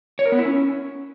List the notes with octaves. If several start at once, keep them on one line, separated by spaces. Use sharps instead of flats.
C#5
A#4
B3
E4
C#4